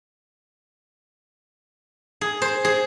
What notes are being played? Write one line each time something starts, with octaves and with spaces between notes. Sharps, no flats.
G#4
C5
G#4